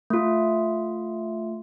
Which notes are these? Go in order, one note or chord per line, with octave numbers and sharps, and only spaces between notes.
A3 F4